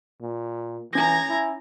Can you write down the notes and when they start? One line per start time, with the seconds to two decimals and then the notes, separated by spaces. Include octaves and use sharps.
0.22 A#2
0.93 E3 C#4 A#5 G#6 A#6
1.29 E4